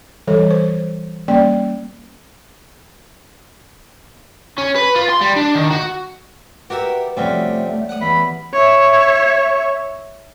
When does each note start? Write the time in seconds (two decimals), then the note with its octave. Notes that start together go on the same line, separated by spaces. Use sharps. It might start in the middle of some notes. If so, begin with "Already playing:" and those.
0.27 E3 G3 A4 C#5
0.51 C5
1.28 G3 A#3 C#4 D5 G5
4.58 C#4
4.76 B4
4.95 F4
5.09 C6
5.21 G3
5.36 D4
5.55 D#3
5.70 F#4
6.70 F#4 G4 A#4 B4 E5
7.17 F2 C3 G3 A3 C#4 F#4
7.89 F#5 D#6
8.01 E2 B5
8.54 C#5 E5